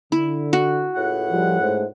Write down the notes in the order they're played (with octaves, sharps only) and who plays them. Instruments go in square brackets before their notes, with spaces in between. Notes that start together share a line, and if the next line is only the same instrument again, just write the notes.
[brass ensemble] D3 [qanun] E4
[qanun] F#4
[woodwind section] C#2 A2 F#5
[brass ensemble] F3 G3
G#2 A3 C5